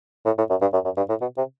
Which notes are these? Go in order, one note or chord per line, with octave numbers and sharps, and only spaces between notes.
A2
A2
F#2
G2
F#2
F#2
G2
A2
B2
C3